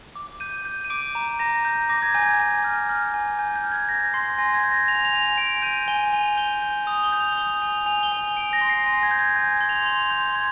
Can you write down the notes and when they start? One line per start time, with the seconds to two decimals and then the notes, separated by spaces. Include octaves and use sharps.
0.15 D6
0.40 G6 D#7
0.65 G6
0.84 D#7
0.90 D6 D7
1.15 A#5
1.39 A#5 A#6
1.65 G6
1.89 D6 A#6
2.02 G#6
2.14 G#5 G6
2.27 G#6
2.39 G#5
2.64 F6
2.89 F6
3.14 G#5
3.39 G#5 G6
3.56 G6
3.64 F6
3.72 G#6
3.88 G6 A#6
4.14 C6 C7
4.38 G#5 A#6
4.55 G#6
4.64 G6
4.71 A#6
4.88 G#5 F7
5.05 F7
5.13 G#5
5.21 F7
5.38 G#5 D7
5.62 G6 D#7
5.88 G#5 G7
6.13 G#5 F7
6.37 G6 G7
6.62 G6
6.87 D#6 F7
7.04 G7
7.12 G6
7.20 F7
7.37 D#6 G7
7.62 G#5 F7
7.86 G#5 F7
8.03 G7
8.12 G#5
8.20 F7
8.36 G#5 D7
8.53 A#6
8.61 C6
8.69 C7
8.86 G#5 A#6
9.03 G#6
9.11 G6
9.19 G#6
9.36 G#5 G6
9.53 G#6
9.61 C6
9.69 F7
9.86 C6 F7
10.10 C6 G6
10.35 C6 G#6